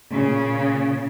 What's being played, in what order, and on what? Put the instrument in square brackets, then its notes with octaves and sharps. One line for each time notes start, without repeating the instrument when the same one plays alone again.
[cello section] A#2 C#3